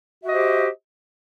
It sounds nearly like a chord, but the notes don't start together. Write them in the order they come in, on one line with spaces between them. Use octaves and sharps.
F#4 E5 D#5 C5 G4